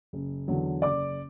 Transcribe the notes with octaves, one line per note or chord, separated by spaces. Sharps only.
F#1
E2 D3 F#3
F#1 D5 D6